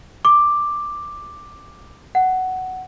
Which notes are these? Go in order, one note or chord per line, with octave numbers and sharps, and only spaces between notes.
D6
F#5